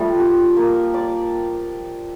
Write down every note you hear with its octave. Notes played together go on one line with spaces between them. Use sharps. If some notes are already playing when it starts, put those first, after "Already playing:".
Already playing: F3 G3 A3
G4
A#3
D5